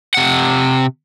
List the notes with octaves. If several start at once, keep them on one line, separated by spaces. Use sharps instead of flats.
C3 F#5